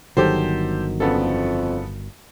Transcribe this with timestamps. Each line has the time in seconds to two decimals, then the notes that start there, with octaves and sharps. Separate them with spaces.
0.17 G1 D#3 F#3 G4 A4 C5
1.00 F2 C#3 B3 A4